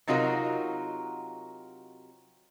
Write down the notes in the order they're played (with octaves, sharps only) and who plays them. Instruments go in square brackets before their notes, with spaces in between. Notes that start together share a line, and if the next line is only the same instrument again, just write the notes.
[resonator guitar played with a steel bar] C3 F#3 D#4 F4 F#4 A#4